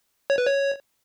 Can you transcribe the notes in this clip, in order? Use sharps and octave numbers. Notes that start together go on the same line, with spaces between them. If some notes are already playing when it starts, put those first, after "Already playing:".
C#5
B4
C#5